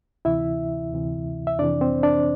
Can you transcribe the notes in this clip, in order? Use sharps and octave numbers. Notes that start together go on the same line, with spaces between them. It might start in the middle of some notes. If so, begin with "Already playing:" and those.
D2 C3 E3 E4 E5
D2 C3 E3
E5
F2 C3 E3 D4 D5
C4 C5
D4 D5